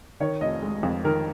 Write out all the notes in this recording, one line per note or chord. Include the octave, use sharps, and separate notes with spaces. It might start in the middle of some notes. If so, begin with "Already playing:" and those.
D#3 C#5
F1 D#5
G#3
F2
D#3 A#4